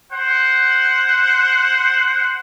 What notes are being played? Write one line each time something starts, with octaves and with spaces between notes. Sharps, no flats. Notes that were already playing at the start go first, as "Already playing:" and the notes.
C5 F#5